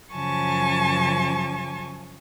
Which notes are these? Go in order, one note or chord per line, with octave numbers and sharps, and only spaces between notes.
F#2 C#3 F3 G#5 A5 C#6